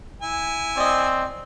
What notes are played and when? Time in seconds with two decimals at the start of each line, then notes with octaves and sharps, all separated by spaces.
0.22 E4 G#5
0.77 C4 D5 D#5